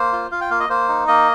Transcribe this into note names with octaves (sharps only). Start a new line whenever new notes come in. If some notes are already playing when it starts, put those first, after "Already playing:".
Already playing: A#3 C5
F4
F4 F5
G5
A#3 F5
D#5
A#3 C5
D#4
A#3 D#5